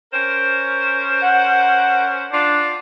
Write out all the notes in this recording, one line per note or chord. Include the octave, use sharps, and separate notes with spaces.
C#4 A#4 C5
F#5
D4 F4 D5